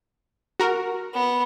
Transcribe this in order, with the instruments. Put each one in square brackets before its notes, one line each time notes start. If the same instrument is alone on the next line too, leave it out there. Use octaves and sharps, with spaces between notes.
[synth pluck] F#4 A#4
[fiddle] B3